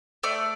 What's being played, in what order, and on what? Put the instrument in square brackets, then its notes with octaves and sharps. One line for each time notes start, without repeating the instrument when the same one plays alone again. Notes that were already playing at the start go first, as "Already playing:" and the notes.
[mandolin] A3 D5